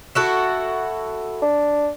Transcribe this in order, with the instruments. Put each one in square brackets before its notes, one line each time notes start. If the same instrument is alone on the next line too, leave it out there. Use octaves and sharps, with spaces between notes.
[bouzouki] E4 F#4 A4
[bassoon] D4